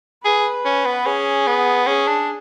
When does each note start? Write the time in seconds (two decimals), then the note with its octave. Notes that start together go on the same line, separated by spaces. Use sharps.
0.24 G#4 B4
0.65 C#4
0.85 B3
1.06 C#4 G#4
1.47 B3
1.87 C#4 G#4
2.07 D4